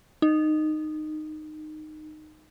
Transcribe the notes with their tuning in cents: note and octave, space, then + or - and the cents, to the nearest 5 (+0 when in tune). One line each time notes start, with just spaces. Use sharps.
D#4 -15